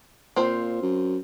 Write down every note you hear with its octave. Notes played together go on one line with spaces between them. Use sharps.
A#2 C4 F4 C5
F#2